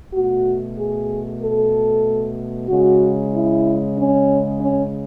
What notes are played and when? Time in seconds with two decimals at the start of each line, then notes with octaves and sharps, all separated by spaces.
0.13 B2 A3 F#4
0.77 G#4
1.41 A4
2.69 C#3 G#3 F#4
3.33 E4
3.97 C#4
4.60 C#4